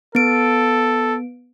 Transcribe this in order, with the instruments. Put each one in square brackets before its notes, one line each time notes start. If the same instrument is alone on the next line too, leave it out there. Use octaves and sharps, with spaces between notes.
[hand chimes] B3 D7 [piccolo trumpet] A4